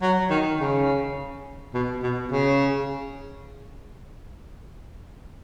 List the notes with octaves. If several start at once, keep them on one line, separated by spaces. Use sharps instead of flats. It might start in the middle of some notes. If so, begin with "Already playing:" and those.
F#3
D#3
C#3
B2
B2
C#3